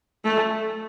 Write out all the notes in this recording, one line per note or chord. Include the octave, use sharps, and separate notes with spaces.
A3